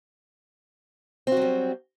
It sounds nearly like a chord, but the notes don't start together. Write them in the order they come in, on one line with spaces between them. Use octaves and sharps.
C4 F#4 F#3 G3